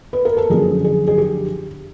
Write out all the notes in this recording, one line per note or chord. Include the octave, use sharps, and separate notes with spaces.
B4
A#4
A4
F#2 D3 F3 G#4
G#4
G#4
G4